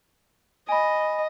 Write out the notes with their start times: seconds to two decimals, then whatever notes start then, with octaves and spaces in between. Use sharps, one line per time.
0.69 D#5 G#5 B5